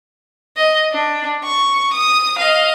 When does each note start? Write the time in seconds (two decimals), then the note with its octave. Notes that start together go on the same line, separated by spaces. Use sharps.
0.57 D#5
0.92 D4
1.44 C#6
1.94 D#6
2.39 D#5 F5